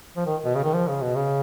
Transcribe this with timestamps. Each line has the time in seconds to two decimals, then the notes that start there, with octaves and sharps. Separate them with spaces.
0.16 F3
0.26 D#3
0.45 B2
0.55 C#3
0.64 D#3
0.73 F3
0.87 C#3
1.02 B2
1.15 C#3